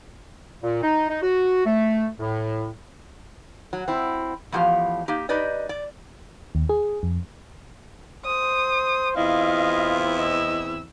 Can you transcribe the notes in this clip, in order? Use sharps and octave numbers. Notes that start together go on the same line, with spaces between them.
A#2
D#4
D#4
F#4
A3
A2
F#3
C4 E4
E2 A2 F3 G4 F5
A#3 D#4 G4
D#4 G4 B4 D5 D#5
D5
D#2
G#4
F2
C5 D#6
E2 C4 E4 F4 D#5 F5
D#5 E6